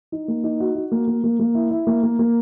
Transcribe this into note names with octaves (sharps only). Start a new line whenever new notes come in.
D#4
A#3
D#4
F#4
F#4
A#3
A#3
A#3
A#3
E4
E4
A#3
A#3
A#3